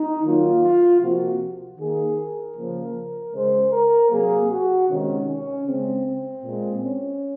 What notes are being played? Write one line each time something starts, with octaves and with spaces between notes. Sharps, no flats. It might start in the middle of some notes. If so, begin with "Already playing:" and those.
Already playing: D#4
D#3 F#3 A#3 F4
F4
C3 F3 A#3 F#4
D#3 A#3 G#4
A#4
C#3 F3 A#3
C#3 G#3 C5
A#4
C3 F#3 A#3 G#4
F#4
C3 D#3 G#3 C#4
C#4
C#3 G#3 C4
C4
A#2 G#3
C#4